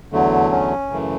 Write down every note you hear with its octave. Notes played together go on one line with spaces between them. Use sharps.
E2 D3 F#3 A3
C#4
F#2 C#3 E3 A3